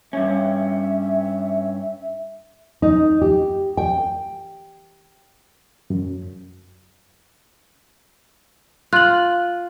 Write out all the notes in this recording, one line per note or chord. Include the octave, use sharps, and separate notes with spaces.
G2 C#4 E5
D#4
G4
G5
F#2
F4 F#6 F#7